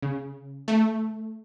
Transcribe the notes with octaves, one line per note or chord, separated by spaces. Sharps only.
C#3
A3